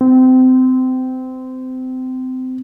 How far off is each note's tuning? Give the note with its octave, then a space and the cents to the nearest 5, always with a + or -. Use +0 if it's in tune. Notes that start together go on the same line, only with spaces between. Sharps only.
C4 -25